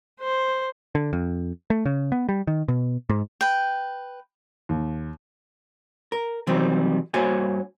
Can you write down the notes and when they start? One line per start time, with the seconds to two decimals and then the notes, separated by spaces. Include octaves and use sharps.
0.20 C5
0.95 D3
1.13 F2
1.70 A3
1.86 C#3
2.12 B3
2.29 G3
2.47 D#3
2.68 B2
3.09 G#2
3.41 B4 G5
4.69 D#2
6.12 A#4
6.47 C3 D#3 E3 F#3 G3 C4
7.14 G2 A#3 F#4 C5 C#5 G#5